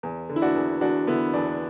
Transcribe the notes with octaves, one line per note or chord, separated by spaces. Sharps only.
E2
D3
E4
D4 F#4
E2
E2 D4 F#4
D3 B3 E4
E2 D4